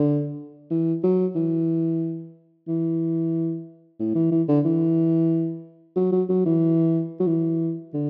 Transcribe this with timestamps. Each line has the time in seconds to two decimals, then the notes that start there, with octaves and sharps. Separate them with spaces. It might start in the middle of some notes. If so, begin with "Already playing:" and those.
Already playing: D3
0.71 E3
1.03 F#3
1.35 E3
2.68 E3
3.99 A2
4.15 E3
4.31 E3
4.48 D3
4.65 E3
5.96 F#3
6.12 F#3
6.29 F#3
6.46 E3
7.20 F#3
7.27 E3
7.93 D3